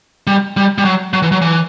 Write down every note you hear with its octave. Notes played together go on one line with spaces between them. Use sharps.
G3
G3
G3
F#3
F#3
E3
F#3
E3